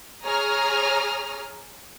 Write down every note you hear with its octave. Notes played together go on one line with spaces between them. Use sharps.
G#4 C#5 A#5 D#6 F6